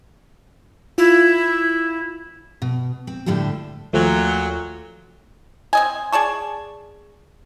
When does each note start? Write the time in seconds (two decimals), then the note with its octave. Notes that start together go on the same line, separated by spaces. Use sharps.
0.98 E4 F4
2.62 B2
3.07 C4
3.26 A2 D3 G3 G4 A4
3.93 D#2 A#2 F3 F#3 A3
5.73 C4 D#5 G#5
6.12 G#4 D5 A5 C#6